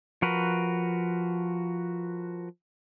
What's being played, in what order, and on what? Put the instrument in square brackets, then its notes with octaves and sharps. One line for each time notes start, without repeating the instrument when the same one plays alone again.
[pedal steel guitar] F3 F#4 A#4 B4